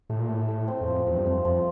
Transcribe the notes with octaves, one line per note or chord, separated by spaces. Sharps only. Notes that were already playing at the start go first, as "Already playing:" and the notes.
A2 A3
A#2
A2 A3
A3
C4
E2
F2 F3
E2 F3
G2
F2 A3
F2 F3